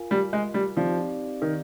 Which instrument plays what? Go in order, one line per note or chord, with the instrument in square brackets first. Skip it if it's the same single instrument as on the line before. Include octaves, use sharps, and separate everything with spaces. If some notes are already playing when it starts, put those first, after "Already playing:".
Already playing: [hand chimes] F4 A#4 F5 G#5
[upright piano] G3
G#3
G3
[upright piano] F3 [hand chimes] C4 D#4 G4 D5 F5
[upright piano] D#3